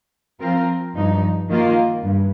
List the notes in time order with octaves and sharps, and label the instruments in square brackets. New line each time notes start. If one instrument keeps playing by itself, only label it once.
[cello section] F3 C4 F4 A#4
G2 F3 D#4
D#3 A#3 F4
G2